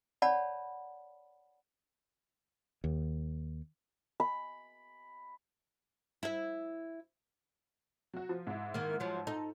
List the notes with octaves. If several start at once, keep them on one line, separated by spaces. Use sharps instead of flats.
C#5 D5 F#5 A5 B5
D#2
B5
E4 E5
F#3 F#4
F3
G#2 E4
D#3 A#3
F3 F#3
D#4 A4